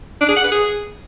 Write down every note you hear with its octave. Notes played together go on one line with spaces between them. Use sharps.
D4
G#4
F#5
B4
G#4